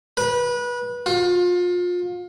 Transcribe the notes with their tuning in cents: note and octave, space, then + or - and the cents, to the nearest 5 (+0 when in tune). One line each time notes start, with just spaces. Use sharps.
B4 -25
F4 +30